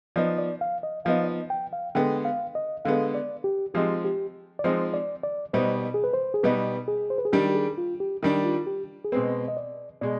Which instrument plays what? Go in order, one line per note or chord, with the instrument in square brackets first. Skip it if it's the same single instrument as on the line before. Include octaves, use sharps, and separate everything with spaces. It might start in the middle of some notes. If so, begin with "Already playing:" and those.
[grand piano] F3 B3 D#4 [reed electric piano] D5
[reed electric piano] D5
F5
D#5
[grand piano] F3 B3 D#4 [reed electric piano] F5
[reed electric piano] D5
D#5
G5
F5
[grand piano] D3 G#3 B3 [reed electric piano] G5
[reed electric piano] F5
D#5
[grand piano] D3 G#3 B3 [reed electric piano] F5
[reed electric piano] D5
G4
[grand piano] F3 G#3 C4 D#4 [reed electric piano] G4
[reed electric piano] G4
D5
[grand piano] F3 G#3 C4 D#4 [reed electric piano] C5
[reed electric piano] D5
D5
[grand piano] B2 G3 B3 D#4 [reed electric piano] C5
[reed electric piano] G#4
B4
C5
G#4
[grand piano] B2 G3 B3 D#4 [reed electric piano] B4
[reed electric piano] G#4
C5
B4
G#4
[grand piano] D#3 G3 D4 [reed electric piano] G4
[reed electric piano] G4
G#4
F4
G4
[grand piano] D#3 G3 D4
[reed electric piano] F4
G4
G#4
[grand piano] B2 G#3 C4 [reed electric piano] B4
[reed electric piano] D#5
D5
[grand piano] B2 G#3 [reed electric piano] D5